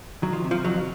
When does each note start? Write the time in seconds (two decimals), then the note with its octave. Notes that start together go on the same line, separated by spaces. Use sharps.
0.22 D#3 F#3
0.33 F3
0.44 C3
0.51 F3
0.64 F2 F#3